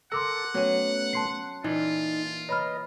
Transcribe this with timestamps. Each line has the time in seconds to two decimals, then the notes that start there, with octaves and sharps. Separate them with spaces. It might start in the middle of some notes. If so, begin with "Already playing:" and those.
0.12 A4 A#4 F#5 C6 D6 E6
0.55 F#3 A3 B3 C#4
1.13 A5 C6 C7
1.64 A#2 E3 D#4 F4
2.49 B4 C#5 D#5 A#5 B5 F6